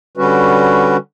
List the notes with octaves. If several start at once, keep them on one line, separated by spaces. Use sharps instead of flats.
D3 G3 C#4 F#4 B4